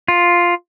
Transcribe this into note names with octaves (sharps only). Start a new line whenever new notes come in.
F4